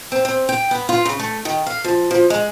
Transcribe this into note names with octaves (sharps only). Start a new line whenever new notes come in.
C4
C4
G5
B3
F4
C#3
A3
D#3
F5
F3
F3
G#3